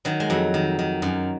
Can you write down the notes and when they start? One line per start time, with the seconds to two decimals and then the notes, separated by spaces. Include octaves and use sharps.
0.05 D#3 F#3
0.20 G#3
0.30 F2 F#3
0.54 D#3
0.79 D#3
1.02 F#2